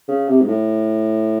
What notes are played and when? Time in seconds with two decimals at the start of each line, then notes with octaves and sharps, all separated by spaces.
0.08 C#3
0.28 C3
0.42 G#2
0.48 A2